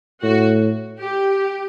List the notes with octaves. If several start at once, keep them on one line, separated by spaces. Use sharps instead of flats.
A2 F#4
G4